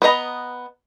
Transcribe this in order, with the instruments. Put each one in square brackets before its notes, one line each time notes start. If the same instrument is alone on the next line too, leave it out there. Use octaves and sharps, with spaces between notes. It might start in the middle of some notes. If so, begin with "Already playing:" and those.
[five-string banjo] B3 B4 D#5 A#5